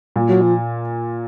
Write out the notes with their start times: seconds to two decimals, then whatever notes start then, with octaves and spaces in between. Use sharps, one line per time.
0.16 A#2
0.29 F#3
0.41 F3